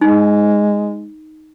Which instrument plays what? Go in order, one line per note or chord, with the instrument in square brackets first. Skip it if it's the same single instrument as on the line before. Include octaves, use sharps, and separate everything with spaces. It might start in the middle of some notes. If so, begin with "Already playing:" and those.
[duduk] G#3 [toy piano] D#4